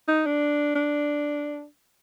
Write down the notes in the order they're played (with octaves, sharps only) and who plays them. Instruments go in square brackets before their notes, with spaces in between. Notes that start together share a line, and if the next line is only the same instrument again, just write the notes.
[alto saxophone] D#4
D4
D4